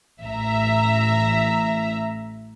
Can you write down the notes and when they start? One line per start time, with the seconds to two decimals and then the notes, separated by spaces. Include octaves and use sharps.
0.22 A1 E5 A#5